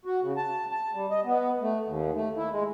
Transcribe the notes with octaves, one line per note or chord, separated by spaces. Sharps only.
F#4
C#3
A5
A5
G3
D#5
B3
A3
D#2
A3
E4
G#3